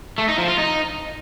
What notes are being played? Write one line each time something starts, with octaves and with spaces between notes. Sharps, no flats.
A3
D#4
F3
F4
D#4